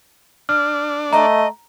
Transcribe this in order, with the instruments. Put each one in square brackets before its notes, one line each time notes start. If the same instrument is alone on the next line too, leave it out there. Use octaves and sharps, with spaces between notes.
[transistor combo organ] D4 [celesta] F6
[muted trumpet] A3 [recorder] D#5 [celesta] A#5